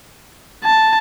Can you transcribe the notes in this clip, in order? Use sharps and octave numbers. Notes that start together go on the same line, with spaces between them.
A5